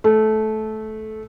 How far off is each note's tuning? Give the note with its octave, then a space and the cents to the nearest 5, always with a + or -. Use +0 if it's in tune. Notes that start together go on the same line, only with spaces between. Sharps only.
A3 -15